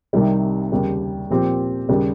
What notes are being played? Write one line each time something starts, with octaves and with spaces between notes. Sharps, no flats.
C2 C3 D#3 G3
D#2 C#3 G3
A#2 F3 C4 G4
D#2 C#3 G3